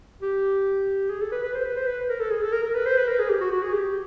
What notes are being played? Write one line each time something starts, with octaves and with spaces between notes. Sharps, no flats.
G4
G#4
A4
B4
B4
C5
B4
C5
B4
A#4
A4
G#4
A4
A#4
A#4
B4
C5
B4
A#4
G#4
G4
F#4
F#4
G#4
G4